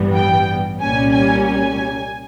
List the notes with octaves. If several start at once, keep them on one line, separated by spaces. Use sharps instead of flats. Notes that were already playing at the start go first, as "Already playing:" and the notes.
Already playing: A1 G2 E3 G3 B3
G5
C2 A#2 G3 A#3 C#4 G#5
G#5
G#5